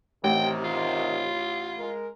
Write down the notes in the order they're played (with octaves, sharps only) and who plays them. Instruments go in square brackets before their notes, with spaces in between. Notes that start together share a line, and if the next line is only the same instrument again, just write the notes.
[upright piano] A1 [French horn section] C3 D#3 [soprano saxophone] G5
[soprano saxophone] F4
[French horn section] G#3 A#4